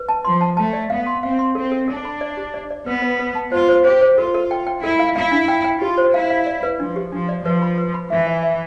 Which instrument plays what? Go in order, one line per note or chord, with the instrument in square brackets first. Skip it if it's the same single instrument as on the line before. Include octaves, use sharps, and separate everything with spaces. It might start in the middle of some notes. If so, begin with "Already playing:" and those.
Already playing: [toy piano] B4
A5
[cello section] F3 [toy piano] C6
[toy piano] A5
[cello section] A3 [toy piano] A5
[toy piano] D5
[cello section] B3 [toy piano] F5
[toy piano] C6
[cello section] C4 [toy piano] F5
[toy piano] C6
[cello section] C4 [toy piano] A4
[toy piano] A4
[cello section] D4 [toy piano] A4
[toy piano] B5
D5
G4
D5
D5
[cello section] B3 [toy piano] B4
[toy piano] B4
B4
A5
[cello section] F4 [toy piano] C5
[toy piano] C5
[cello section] G4 [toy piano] C5
[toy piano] C5
[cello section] F4 [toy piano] A4
[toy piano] A4
G5
G5
[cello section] E4 [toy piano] A4
[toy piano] F5
[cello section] E4 [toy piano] F5
[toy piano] D4
G5
G5
[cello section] F4 [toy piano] G4
[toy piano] C5
[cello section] E4 [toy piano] F5
[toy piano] F5
D5
B4
[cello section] F3 [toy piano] D4
[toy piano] G4
[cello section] F3 [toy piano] D4
[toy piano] D5
[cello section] F3 [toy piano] B4
[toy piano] B5
B4
B5
[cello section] E3 [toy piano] E5
[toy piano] E5
E5